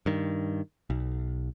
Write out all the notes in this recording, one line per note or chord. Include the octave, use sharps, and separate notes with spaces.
G2 D#3
B1